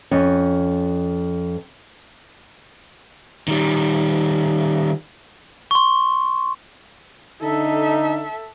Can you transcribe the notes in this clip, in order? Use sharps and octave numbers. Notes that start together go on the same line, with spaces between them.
F2 C#4
D#3 G3
C6 C#6
D3 D#4 A4 E5